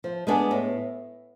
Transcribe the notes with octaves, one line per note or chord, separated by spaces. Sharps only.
F3
G#3 B3 D4 G#4
A2